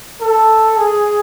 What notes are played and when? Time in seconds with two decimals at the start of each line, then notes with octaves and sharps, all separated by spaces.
0.21 A4
0.77 G#4